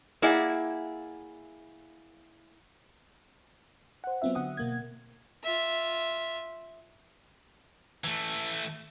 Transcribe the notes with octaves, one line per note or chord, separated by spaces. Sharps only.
A#3 E4 G#4 D5 F#5
C5 F#5
F#3 B3 C4 F4 E5
D3 F#5 D#6
B2 A#3 G#6
F4 E5
E3 A3